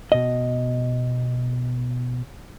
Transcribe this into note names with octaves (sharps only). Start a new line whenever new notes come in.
B2 D#5